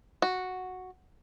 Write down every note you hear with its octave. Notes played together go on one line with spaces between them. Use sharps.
F#4